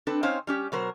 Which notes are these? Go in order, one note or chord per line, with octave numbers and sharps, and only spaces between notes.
C4 D4 A4 B4
C4 C#4 D#4 C5 C#5 F5
G3 C#4 G4
B2 F#3 A#4 C5